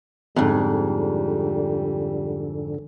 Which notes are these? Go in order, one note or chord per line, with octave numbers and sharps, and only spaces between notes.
F2 G#2 D3 G3